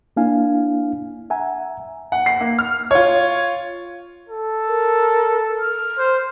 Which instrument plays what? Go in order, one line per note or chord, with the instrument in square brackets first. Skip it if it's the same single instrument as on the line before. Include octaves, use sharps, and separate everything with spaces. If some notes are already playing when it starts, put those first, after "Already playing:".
[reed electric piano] A#3 D4 E4 F5 G#5
E5 F#5 G#5 A#5
[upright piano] F#5
C7
A#3
F6
[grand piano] F4 C#5
[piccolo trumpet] A4
[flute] A#4
F6
[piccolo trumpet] C5